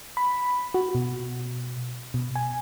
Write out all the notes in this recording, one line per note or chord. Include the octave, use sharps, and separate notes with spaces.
B5
F#4
B2
B2
G#5